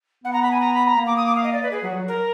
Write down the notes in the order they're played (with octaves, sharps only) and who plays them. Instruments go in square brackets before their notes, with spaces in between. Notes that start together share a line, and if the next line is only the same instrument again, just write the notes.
[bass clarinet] B3 [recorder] F#5
[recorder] A#5
B5
G#5
A#5
B5
A#5
[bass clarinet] A#3
[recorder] D6
D#6
D6
F5
D#5
D5
B4
G#4
[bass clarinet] F#3 [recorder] F#4
[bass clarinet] F#3
[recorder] A#4